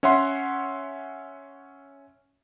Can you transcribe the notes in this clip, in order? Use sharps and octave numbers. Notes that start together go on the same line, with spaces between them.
C#4 C#5 E5 F#5 C6